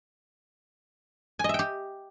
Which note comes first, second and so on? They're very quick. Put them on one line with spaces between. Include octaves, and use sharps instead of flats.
G#5 D#5 E5 G5 G4